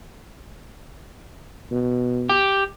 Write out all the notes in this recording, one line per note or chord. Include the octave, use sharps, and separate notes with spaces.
B2
G4